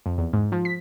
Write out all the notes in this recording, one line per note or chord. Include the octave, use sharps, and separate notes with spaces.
F2
E2
G#2
F3
B6